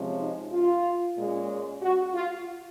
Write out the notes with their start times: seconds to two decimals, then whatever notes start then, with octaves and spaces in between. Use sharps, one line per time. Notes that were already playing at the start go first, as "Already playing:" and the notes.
Already playing: C3 F3 G#3 C#4
0.18 D#4
0.52 F4
1.17 A#2 G#3 C#4
1.82 F#4
2.14 F4